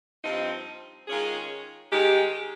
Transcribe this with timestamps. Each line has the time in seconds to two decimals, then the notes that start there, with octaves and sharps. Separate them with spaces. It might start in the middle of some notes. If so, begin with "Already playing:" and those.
0.22 G2 F3 C4 D#4
1.07 D#3 G#3 C#4 F4 G#4
1.91 D#3 G#3 D#4 G4